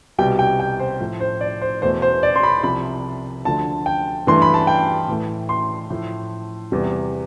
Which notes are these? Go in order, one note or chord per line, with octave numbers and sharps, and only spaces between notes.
C2 B2 G3 G5
G5
G5
C5
A2 F3 A3
C5
D5
C5
E2 B2 A3 C5
C5
D5
C6
B5
C2 C3 F3 B5
D2 D3 F3 A3 A5
G5
G2 E3 A3 C6
B5
A5
G5
A2 E3 A3
C6
A2 F3 A3
E2 C3 G3